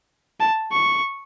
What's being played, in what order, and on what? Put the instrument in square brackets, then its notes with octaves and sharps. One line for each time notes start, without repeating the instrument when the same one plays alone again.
[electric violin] A5
C#6